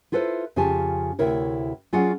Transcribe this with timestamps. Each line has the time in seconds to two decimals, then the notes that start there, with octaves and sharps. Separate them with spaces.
0.12 E4 F4 A4 B4 C5
0.56 F2 C#3 F4 G4 G#5 A5
1.19 D2 C3 E4 A#4 C#5
1.92 F#3 C#4 F4 G#4 D5 F#5